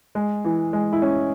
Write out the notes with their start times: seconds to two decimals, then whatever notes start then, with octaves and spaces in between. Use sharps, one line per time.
0.15 G#3
0.45 E3
0.73 G#3
0.93 E4
1.02 C#4